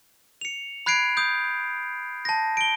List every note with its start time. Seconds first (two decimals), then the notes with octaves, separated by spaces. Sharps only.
0.41 C#7 F7
0.86 B5 F#6 G#6 C7 D7
1.17 D#6 G6
2.25 A5 A#6
2.57 D7 G7